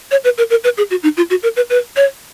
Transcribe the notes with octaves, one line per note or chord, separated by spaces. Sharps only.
C#5
B4
A#4
A#4
B4
G#4
F#4
D#4
F4
F#4
A#4
B4
B4
C#5